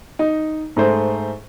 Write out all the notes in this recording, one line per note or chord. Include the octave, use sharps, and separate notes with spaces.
D#4
G#2 A3 C5